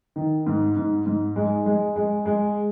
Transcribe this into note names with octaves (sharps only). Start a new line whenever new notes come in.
D#3
G#2
G#2
G#2
G#3
G#3
G#3
G#3